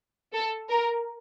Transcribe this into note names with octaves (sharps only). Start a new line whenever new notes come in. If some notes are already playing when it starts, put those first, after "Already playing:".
A4
A#4